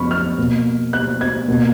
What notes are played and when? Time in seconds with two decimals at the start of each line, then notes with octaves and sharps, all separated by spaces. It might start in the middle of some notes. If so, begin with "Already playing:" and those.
Already playing: F2 C#3 B3 B5 C#6 F6
0.11 F6
0.38 B2 A#3
0.93 F#6
1.21 G#6
1.48 B2 A#3